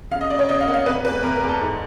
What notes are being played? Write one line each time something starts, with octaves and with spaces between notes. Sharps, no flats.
C#3 F5
D#5
C#3 D5
C#5
C#3 D#5
F5
A#3 F#5
F5
C3 B4
E2 B4
C3 A#4
A#4
E2
A4
G#2